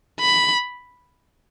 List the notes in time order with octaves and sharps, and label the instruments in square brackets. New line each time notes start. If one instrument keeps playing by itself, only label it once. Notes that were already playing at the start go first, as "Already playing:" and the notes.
[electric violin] B5